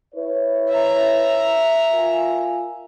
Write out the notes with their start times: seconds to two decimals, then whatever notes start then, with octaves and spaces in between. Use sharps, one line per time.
0.15 E4 B4 C#5
0.70 E5 A#5
1.92 F4 A#4 G#5